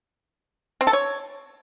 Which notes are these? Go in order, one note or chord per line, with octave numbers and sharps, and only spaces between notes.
C4
A4
C#5